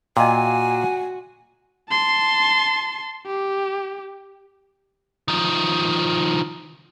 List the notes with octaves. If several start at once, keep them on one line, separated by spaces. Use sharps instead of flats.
A#2 F#4 D#5 F5 G5 G#5
A5 C6
G4
D#3 F3